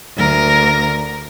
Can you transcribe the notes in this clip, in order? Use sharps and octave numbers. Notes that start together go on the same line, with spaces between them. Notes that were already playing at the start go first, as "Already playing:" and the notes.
D2 A#4